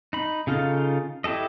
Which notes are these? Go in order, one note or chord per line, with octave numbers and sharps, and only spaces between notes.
D#4 B5
C#3 D#4 F4 A4 F5
E4 G4 A4 D#5